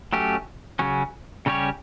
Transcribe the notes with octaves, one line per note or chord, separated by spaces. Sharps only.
F#3 A3 C#4 G4
C#3 F#3 C#4
C#3 G3 C#4 G4 C#5